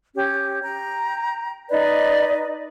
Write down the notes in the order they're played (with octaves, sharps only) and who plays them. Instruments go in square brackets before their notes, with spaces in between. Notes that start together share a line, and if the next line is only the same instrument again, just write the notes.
[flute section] C#4 G4
G5 A#5
[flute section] D#4 B4 D#5 [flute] D5